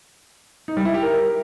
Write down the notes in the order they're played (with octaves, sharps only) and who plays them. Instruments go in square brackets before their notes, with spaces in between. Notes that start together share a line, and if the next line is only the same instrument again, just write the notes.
[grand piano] D#4
G3
E4
G4
A#4